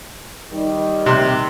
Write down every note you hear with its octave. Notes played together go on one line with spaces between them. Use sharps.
D#3 G3
C3 C6 F#6